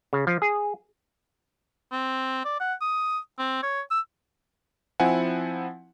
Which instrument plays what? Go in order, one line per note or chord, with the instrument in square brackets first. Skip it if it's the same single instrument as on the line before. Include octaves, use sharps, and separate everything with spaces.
[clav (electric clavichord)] C#3
F3
G#4
[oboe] C4
D5
F#5
D#6
C4
C#5
E6
[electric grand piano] F3 C4 E4 F#5 G#5